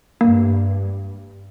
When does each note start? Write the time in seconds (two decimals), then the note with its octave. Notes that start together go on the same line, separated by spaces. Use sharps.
0.21 G2 A#3